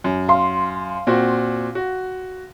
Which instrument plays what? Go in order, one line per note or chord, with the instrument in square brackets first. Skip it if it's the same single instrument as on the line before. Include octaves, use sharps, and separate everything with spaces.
[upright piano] F#2
[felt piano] F5 C6
[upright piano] A#2 C4 F#4
F#4